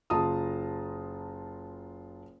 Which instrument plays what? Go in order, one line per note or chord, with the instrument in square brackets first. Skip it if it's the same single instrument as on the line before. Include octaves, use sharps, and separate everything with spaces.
[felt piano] F#1 F4 A5 A#5 D#6